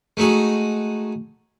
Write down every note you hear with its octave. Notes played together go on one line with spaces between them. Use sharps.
G#3 A3 D#4 F#4 G#4